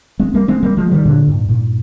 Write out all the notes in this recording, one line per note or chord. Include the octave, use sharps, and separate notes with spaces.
G#3 C4
G3 A#3
G#3 C4
G3 A#3
F3 G#3
D#3 G3
A#2 D3
G2 A#2
G2 A#2